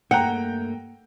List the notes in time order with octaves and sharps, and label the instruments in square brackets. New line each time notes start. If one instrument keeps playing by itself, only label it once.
[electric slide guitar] G2 A3 A#3 [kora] F#5 [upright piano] G5 A#5